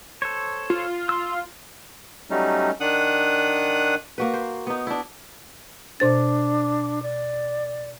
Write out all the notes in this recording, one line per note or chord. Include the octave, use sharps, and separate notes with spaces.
A4 C5 C#5
F4
C6 E6
F#3 G3 A3 C#4 D#4
D#3 D4 F#5 D#6 F#6
A#3 F#4 B4
C5
B3 D#4
D4 E4
B2 D4 C5 A6
D5